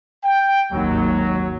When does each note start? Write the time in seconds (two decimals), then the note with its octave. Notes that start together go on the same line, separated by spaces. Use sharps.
0.23 G5
0.72 G#1 D#2 F#3